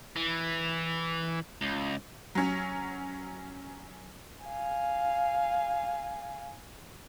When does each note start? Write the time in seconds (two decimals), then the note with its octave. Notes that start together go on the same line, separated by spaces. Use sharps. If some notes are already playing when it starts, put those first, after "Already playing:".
0.16 E3
1.61 C#2
2.35 F#3 C#4
4.45 F5 G#5